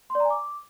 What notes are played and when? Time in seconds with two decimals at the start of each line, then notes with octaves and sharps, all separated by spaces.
0.10 C6
0.15 D5
0.20 A#5
0.25 G#5
0.30 D6